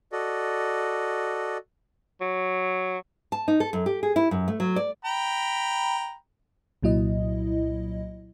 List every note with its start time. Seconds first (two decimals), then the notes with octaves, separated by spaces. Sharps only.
0.12 F#4 A4 D5 D#5
2.21 F#3
3.32 A5
3.48 D#4
3.60 A4
3.73 F#2
3.86 G4
4.03 G#4
4.16 E4
4.31 F#2
4.48 A3
4.60 F#3
4.76 D5
5.05 G5 A#5 B5
6.83 C2 A#2 F#3 E4 D#5